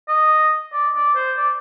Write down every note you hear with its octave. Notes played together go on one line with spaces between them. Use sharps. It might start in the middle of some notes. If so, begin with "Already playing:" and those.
D#5
D5
D5
C5
D5